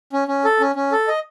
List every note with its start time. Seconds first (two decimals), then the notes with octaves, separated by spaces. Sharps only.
0.13 C#4
0.28 C#4
0.45 A4
0.60 C#4
0.75 C#4
0.92 A4
1.08 D#5